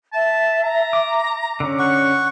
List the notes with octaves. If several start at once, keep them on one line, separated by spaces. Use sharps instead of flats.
E5 A5
A#5
D6
D3 C#4 D6
F#5 C#6